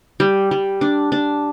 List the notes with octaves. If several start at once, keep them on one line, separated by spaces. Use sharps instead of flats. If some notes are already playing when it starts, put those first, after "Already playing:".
G3
G3
D4
D4